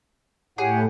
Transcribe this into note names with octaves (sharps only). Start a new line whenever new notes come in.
A2 G4 G#4 C#5 F#5